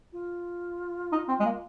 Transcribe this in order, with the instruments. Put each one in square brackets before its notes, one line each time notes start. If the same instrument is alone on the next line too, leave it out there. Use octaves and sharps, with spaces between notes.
[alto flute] F4
[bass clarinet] D#4
C4
G#3
A#3